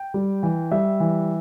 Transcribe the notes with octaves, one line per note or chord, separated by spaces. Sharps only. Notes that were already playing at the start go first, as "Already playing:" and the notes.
Already playing: G5
G3
E3
G3 E5
E3